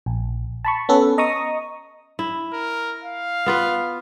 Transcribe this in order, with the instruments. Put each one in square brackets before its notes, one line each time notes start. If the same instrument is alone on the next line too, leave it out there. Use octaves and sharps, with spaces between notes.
[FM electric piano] A#1
A5 B5 C#6
B3 C#4 A4 B4
D#5 A#5 C#6 D#6
[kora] E4
[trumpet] A#4
F5
[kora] B3 F4 B4